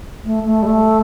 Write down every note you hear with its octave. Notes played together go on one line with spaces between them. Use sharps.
A3
A3
G3
A3